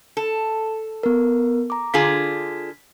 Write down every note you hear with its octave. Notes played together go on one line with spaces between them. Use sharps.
A4
B3 A#4
A#5 D6
D3 F4 G#4 B6